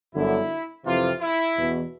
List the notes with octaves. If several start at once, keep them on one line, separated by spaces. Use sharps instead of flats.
G1 F#2 D3 E4
F2 C3 E3 F4
E4
E2 B2